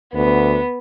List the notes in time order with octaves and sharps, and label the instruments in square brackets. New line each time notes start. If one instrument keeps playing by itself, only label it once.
[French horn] D2 [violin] B3